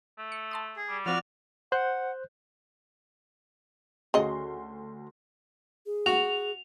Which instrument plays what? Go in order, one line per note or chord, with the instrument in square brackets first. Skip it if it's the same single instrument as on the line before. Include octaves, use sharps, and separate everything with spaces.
[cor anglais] A3
[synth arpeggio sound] C#7
A5 C6 D#6
[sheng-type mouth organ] G#4
[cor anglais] G3
[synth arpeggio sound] F3 C4 F4 [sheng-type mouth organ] F#4 D5 F6
[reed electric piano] C5 F#6 G6 [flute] F#5
[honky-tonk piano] D2 F#4 C6 [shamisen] C#3 D#5
[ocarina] G#4
[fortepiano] F#4 [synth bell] F7